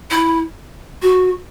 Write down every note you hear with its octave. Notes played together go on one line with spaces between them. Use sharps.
E4
F#4